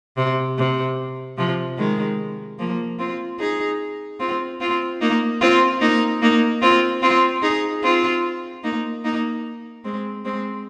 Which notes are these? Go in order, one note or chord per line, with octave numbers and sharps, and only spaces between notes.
C3
C3
C3 F3
D#3 G#3
F3 A#3
C4 F4
D#4 G#4
C4 F4
C4 F4
A#3 D#4
C4 F4
A#3 D#4
A#3 D#4
C4 F4
C4 F4
D#4 G#4
C4 F4
A#3 D#4
A#3 D#4
G#3 C4
G#3 C4